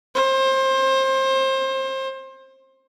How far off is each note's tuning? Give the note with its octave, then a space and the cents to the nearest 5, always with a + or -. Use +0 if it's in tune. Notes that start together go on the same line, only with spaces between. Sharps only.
C5 +25